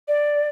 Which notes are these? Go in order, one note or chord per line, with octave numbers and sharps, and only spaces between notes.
D5